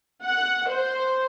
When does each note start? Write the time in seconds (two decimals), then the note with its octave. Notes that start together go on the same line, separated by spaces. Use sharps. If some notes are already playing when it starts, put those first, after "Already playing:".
0.24 F#5
0.70 C5